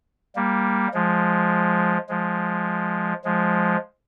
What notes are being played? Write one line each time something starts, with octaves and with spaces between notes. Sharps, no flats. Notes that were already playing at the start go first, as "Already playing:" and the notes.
G3 A#3
F3 G#3
F3 G#3
F3 G#3